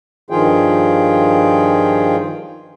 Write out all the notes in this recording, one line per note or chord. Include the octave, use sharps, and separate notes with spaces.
G2 D#3 F3 F4 G#4 G5